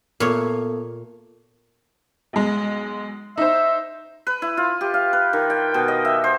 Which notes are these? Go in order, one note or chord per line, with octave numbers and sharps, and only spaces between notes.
A#2 B3 F4 A4 C#5
B1 G#3
D#4 C5 E5
B4
E4
F4
G4
F5
B4
D#3
G5
B2
D#5
E5
C5